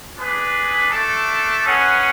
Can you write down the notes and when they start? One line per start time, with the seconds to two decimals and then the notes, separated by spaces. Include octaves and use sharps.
0.15 D4 G#4 B4
0.91 A3 D4 A4
1.65 C#4 G#4 B4 F#5